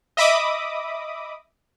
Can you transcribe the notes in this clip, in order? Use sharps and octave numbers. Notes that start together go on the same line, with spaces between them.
D#5 E5 B5 D6 D#6